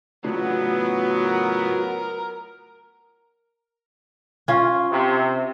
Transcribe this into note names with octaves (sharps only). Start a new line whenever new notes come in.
A2 C#3 F#3 B3 D4 F4 F#4
A#4
C#4 F4
C3